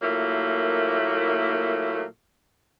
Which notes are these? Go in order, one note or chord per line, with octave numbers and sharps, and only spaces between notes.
A#2 F#3 A3 A#3 E4